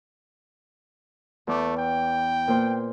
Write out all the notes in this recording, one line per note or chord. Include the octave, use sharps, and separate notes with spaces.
E2 A3 D6
G5
A#2 C5